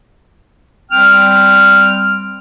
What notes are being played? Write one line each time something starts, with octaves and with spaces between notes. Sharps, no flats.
G3 C4 G5 F6